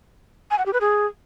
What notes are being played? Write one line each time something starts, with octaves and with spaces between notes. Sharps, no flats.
G#5
F#5
G4
B4
G#4